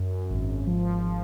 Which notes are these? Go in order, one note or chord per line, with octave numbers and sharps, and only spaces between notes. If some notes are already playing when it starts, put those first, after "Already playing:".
Already playing: F#2
G#1
F3
F3